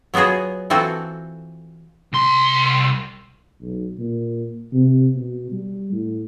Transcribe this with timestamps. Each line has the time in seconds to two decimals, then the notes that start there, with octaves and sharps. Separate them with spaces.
0.14 F#3 B3 F4 F#4 G#4
0.70 E3 C4 F4 F#4 A4
2.13 C2 C6
3.61 B1
3.99 A#2
4.73 C3
5.16 B2
5.52 G3
5.92 A2